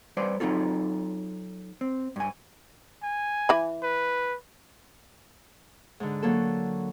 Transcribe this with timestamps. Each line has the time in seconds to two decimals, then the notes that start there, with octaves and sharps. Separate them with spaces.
0.17 G3 B4 C5 D5
0.40 F#3 C4 D#4 F4 A4
1.81 C4
2.16 G2 G#5
3.03 G#5
3.49 E3 B5
3.83 B4
6.00 G#2 D3
6.22 F#3 A#3 A4